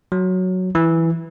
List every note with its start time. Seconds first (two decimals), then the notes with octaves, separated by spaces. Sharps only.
0.12 F#3
0.75 E3